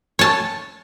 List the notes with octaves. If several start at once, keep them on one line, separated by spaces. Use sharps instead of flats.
C#5 A5